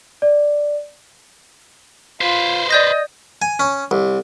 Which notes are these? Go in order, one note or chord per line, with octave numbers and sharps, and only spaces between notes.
D5
F4 B4 C5
D5 D#5 G6 A#6
G#5
C#4
C2